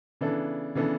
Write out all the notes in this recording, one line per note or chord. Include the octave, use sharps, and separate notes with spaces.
C#3 E3 B3 D4 A4
C#3 E3 B3 D4 A4